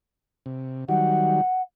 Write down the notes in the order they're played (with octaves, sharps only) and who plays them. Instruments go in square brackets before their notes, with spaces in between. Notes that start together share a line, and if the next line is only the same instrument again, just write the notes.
[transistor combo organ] C3
[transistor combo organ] D#3 F#3 G3 [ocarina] F#5